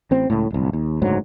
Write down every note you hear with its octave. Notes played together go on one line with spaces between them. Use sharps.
A1 C4
C#2 A2
D1 C2
D#2
F#1 D2 G#2 F#3